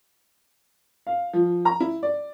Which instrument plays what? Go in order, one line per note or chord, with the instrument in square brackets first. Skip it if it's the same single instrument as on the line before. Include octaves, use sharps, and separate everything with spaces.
[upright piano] F5
F3
A#5
E4
D5